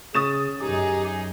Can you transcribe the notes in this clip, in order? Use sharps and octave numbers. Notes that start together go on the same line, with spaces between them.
C#3 C#4 G#4 D#6 A6 E7
F#2 D#4 G4 G#4